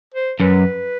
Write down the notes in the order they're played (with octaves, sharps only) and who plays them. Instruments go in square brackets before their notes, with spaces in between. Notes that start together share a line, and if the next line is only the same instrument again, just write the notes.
[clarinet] C5
[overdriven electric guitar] F#2 [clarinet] B4